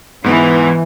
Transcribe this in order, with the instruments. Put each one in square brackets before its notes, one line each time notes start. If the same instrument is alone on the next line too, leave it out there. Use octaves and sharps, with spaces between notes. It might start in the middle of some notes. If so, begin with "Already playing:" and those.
[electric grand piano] G#2 B3 [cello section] E3